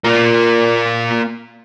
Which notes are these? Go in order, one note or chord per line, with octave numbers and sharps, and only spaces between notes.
A#3 F4